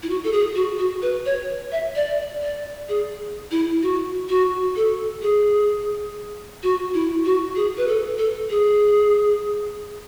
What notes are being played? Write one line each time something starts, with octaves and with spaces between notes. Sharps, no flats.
E4
F#4
A4
G#4
F#4
F#4
B4
C#5
E5
D5
D5
G#4
E4
F#4
F#4
A4
G#4
F#4
E4
F#4
G#4
B4
A4
A4
G#4